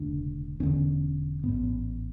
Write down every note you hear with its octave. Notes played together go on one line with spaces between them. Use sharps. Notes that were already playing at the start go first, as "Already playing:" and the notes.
Already playing: E1 D2 C#3 D4
E1 E2 D3 C#4
A1 G#2 B3